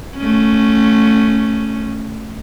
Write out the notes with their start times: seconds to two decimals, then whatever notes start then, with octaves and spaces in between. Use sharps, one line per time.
0.17 A3 C#4